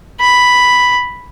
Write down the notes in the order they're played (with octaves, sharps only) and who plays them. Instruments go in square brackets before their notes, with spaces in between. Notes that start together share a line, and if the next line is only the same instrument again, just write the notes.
[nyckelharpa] B5